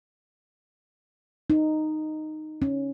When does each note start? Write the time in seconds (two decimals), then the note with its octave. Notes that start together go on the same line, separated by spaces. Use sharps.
1.50 D#4
2.62 C#4